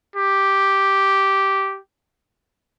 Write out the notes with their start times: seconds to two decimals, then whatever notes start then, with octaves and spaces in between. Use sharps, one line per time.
0.16 G4